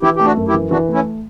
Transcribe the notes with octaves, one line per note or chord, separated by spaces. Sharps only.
E3 E4 G4
A3 G4
D4 F#4
F#2
E4 G4
E3
E3 D4 F#4
A3
C#4 E4